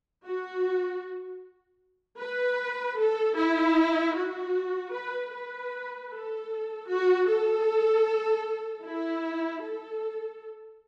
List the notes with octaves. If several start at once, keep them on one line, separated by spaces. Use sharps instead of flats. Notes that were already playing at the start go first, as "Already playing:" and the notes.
F#4
B4
A4
E4
F#4
B4
B4
A4
F#4
A4
E4
A4